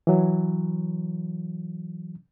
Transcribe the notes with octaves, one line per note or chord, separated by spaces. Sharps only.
E3 F#3